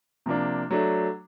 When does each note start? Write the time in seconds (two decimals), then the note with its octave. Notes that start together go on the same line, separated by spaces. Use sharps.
0.26 C3 F3 A#3 D4
0.71 F#3 A3 D4